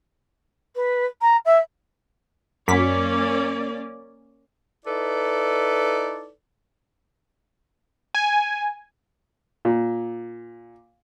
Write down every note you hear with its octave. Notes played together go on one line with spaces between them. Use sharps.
B4
A#5
E5
F#2 A#3 C#4 D5 B6
D#4 E4 A4 B4 D5
G#5
A#2